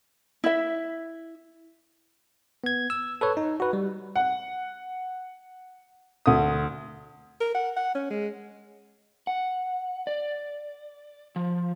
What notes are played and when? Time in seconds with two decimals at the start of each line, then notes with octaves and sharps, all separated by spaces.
0.44 E4 E5
2.64 B3 G#6
2.90 E6
3.21 A4 B4 C#5
3.37 D#4
3.60 F#4 B4
3.73 G3
4.16 F#5
6.26 D2 D#6
7.41 A#4
7.54 F#5
7.76 F#5
7.95 C#4
8.10 G#3
9.27 F#5
10.07 D5
11.36 F3